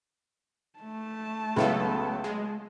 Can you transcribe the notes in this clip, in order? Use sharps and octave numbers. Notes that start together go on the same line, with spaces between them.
A3 A5
C#2 F#3 B3 E4 A4 F5
G#3